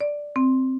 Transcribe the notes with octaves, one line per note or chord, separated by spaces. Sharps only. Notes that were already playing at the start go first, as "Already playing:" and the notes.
D5
C4